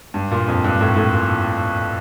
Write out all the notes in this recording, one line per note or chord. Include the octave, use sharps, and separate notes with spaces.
G2
A#2
F2
G2
A2
A2
A#2